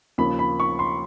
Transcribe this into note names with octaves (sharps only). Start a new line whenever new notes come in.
D#2 C#3 F3 A#3 B5
B5
C#6
C6